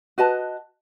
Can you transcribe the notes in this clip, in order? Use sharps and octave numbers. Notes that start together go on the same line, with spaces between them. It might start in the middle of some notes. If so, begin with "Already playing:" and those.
F#4 B4 D#5 A5